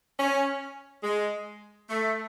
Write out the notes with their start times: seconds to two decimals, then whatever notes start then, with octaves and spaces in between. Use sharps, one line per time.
0.19 C#4
1.03 G#3
1.90 A3